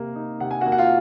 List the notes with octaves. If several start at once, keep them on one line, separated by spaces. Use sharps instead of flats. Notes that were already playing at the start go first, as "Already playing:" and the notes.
Already playing: C3 A#3
D#4
C3 F#5
G#5
F#4 F#5
A#3
F#5
F4 F5